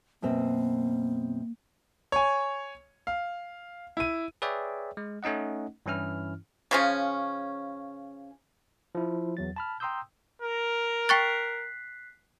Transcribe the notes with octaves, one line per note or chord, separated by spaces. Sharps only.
F#2 B2 A#3 C4
C#5 G#5
F5
E4 D#7
G#4 B4 C#5 D5 E5 G5
G#3
A3 C#4 D#4 D#5 F#5
G2 E3 C#4 E4 F6
C#3 F3 C#4
F3 E4
E2 F#3 A6
A5 B5 F6
G5 A#5 C6 D#6 E6 G6
A#4
G5 C#6 F#6 A6 B6 C7